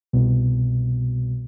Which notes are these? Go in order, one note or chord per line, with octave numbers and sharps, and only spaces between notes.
C2 B2